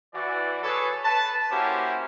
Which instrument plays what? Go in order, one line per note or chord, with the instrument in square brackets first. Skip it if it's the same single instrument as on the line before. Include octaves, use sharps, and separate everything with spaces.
[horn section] E3 F#4 D5
G#4 A4 B4 C#5
B4 A5
A#3 C#4 E4 F#4 G4 C5